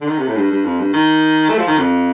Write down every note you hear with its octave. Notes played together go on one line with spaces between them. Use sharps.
D3
D#3
C3
A2
G2
G2
F2
G2
D#3
A3
F3
D#3
F2